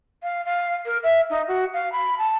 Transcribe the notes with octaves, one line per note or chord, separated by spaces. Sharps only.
F5
F5
A#4
E5
D#4
F#4
F5
B5
A5